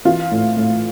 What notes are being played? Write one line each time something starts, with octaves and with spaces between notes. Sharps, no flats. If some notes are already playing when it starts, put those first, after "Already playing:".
E3 F4
A2
A2